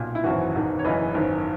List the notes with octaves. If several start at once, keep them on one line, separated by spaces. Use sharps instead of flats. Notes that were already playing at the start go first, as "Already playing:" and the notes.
Already playing: B1 A#2
E4
G#1 F#2 E3 F#4
E1 E2 D#3
C#5
F#1 F#2 C#3 E3 B4 D#5
G#1 F#2 D#3